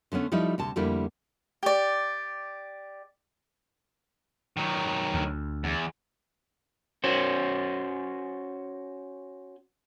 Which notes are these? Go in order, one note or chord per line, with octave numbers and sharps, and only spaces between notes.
D3 A3 B3 C#4
F3 G3 A3 D#4 E4
D2 C3 A5
F2 D3 G3 A3 A#3 E4
G4 D5
D#3 F#3
D2
E2
C#4 F#4 C5